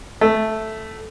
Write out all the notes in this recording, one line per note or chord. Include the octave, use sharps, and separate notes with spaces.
A3